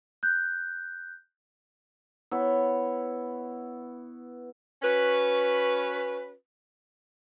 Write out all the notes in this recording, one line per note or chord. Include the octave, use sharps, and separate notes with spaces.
F#6 G6
B3 E4 C#5
C#4 F#4 B4